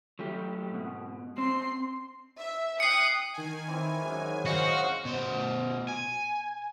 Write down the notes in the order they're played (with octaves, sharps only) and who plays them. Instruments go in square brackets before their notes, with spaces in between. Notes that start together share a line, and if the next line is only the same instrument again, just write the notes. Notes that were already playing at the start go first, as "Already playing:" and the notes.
[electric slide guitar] F#3 A3 G4
G#2 B2
[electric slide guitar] C4 [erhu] C6
[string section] E5
[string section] G5 D#6 F#6 [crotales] C7 C#7
[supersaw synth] D#3 G#5
[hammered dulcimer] E3 C4 E4
F#2 G#3
[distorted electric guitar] F#4 [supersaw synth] C5 D#5 F5
[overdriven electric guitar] B2 C5
G#5